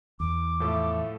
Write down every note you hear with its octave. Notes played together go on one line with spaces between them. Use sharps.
E2 D6
A2 F3 A3 A4